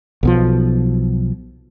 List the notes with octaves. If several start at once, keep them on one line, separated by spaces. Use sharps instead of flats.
B1 B2 F3